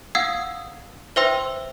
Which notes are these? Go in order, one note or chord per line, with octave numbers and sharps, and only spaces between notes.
F5 F#5 D#6 E6 G#6 C7
B4 C5 E5 G5 C6 E6